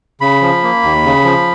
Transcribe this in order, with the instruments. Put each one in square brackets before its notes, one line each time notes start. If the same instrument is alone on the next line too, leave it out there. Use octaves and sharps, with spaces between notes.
[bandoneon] C#3 B5
F3
A#3
D#2
C#3
F3